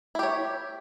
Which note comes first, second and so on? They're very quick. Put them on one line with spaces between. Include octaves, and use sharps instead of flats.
E4 G4 C#5